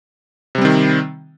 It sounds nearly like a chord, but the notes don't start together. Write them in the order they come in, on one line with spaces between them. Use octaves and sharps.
C3 G3 C4 D#3